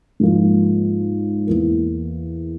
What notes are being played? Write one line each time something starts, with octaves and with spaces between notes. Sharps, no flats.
G#2 F3 A#3 F4
E2 E3 A#3